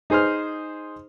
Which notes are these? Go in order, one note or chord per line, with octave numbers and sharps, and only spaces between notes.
D#4 G#4 C5 D#6 F6